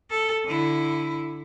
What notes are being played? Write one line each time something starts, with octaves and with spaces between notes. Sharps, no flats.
A4
D3 E4